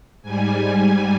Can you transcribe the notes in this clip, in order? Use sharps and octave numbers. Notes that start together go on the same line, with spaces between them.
G#2 G3 G#5